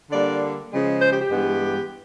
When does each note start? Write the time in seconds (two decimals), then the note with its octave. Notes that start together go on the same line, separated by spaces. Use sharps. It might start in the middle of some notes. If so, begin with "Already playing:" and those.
0.11 D3 G3 A#3 D4 D5
0.71 C#3 F3 G#3
1.01 C5
1.10 G4
1.21 G4
1.30 G2 E3 G#3 B3